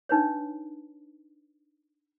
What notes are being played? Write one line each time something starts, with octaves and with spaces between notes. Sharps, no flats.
D4 D#4 B4 C#5